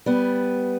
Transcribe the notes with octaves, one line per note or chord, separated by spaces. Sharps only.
G3 B3